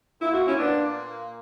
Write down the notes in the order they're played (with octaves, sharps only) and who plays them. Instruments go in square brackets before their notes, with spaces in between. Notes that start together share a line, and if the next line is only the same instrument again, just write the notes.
[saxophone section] A#2 A#3 E4
F#4
C#4 E4
B3 D4